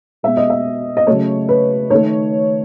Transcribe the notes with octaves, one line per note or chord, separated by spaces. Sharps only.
B2 G#3 E5
D#5
E5
D#5
C#3 F#3 A3 C#5
B4
D#3 A3 C#5